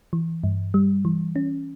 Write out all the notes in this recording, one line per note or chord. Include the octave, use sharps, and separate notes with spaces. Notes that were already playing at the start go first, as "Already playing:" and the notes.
E3
G2
G3
E3
C#4